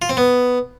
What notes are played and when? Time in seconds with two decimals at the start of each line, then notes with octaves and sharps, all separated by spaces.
0.02 F4
0.09 C4
0.17 B3